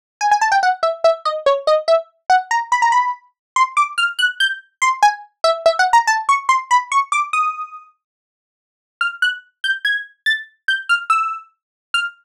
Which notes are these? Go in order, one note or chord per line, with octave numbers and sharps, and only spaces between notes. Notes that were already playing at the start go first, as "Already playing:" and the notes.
G#5
G#5
A5
G5
F#5
E5
E5
D#5
C#5
D#5
E5
F#5
A#5
B5
A#5
B5
C6
D6
F6
F#6
G6
C6
G#5
E5
E5
F#5
A#5
A5
C#6
C6
B5
C#6
D6
D#6
F6
F#6
G6
G#6
A6
G6
F6
E6
F6